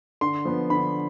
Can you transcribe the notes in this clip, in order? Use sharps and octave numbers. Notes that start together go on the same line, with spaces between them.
D3 C6
F3 B3
D3 B5